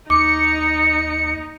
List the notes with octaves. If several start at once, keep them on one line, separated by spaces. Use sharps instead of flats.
D#2 D#4 D6 C#7